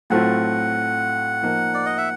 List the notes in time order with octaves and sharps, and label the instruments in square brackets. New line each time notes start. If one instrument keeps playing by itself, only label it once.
[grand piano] A2 F#3 A3 C4 F4 [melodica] F#5
[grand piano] F3 A#3 D#4
[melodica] D5
D#5
E5